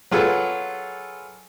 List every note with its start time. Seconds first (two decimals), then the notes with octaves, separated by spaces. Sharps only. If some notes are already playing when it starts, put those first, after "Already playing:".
0.11 F#3 F4 G#4 A4 B4